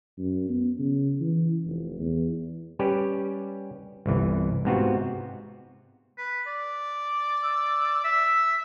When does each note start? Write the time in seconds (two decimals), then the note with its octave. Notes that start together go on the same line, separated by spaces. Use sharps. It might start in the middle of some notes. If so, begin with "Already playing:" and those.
0.18 F#2
0.49 B3
0.79 C#3
1.21 E3
1.65 F1
1.99 E2
2.79 G3 C#4 G4 B4
4.06 G1 C2 E3
4.65 G#2 C3 B3 C4 F4 F#4
6.18 B4
6.47 D5
7.43 E6
8.04 E5 E6